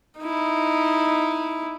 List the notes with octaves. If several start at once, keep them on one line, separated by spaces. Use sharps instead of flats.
D#4 E4